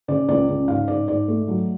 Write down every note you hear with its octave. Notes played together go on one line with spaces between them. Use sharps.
C#3 D5
C#2 D5
C#3
G#2 F5
G#2 D5
G#2 D5
A3
F#3